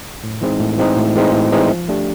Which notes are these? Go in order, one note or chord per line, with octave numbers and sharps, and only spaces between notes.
A2
E3 G#3 C4 D#4
A2
E3 G#3 C4 D#4
A2
E3 G#3 C4 D#4
A2
E3 G#3 C4 D#4
F3
A3 D4 G4